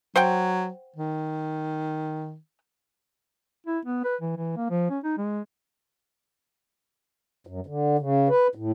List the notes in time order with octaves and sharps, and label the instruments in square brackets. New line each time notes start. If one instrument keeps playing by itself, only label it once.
[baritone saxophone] F#3 [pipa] C5 F#5 G5
[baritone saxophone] D#3
[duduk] E4
B3
B4
E3
E3
A#3
F3
C#4
D#4
G#3
[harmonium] F#2
D3
C#3
B4
A2